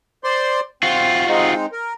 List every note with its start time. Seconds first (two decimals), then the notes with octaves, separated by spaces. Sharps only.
0.24 C5 D5 C6
0.83 C4 F4 F#4
1.28 G#3 C4 D#4
1.72 A#4